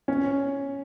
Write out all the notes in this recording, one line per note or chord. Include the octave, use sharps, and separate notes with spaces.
C#4